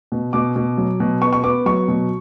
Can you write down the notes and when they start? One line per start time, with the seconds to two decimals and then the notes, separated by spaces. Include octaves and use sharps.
0.12 B2
0.33 B2 D6
0.56 B2
0.78 F#3
1.00 B2
1.21 B3 C#6
1.33 C#6
1.44 B3 D6
1.66 F#3 C#6
1.88 B2